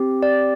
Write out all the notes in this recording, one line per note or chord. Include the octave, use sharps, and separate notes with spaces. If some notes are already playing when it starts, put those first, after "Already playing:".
Already playing: C4 G4
D5